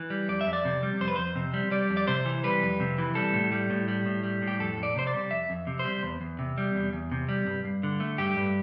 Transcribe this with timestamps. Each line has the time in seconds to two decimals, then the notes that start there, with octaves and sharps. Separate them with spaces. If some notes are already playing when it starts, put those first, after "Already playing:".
Already playing: E3
0.10 G3
0.28 F2 D5
0.41 E5
0.47 F2
0.53 D5
0.65 C3
0.83 G3
1.01 F2 C5
1.08 B4
1.16 F2 C5
1.36 C3
1.54 G3
1.71 G3 D5
1.90 F2
1.97 D5
2.07 C3 C5
2.25 E3
2.44 G3 B4
2.63 F2
2.80 C3
2.98 E3
3.15 G3 A4
3.34 A2
3.52 G3
3.70 A2
3.88 G3
4.06 A2
4.23 G3
4.42 A2
4.48 G4
4.60 F2 A4
4.77 F2
4.83 D5
4.96 C3 C5
5.07 D5
5.13 G3
5.31 F2 E5
5.50 F2
5.67 C3
5.79 C5
5.85 G3
6.03 E2
6.21 E2
6.39 C3
6.58 G3
6.75 E2
6.93 E2
7.12 C3
7.29 G3
7.47 G2
7.65 G2
7.83 D3
8.00 A3
8.18 G2 G4
8.37 G2